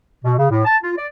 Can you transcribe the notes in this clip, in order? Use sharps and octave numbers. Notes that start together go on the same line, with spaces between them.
B2
C#3
A2
A5
F4
D5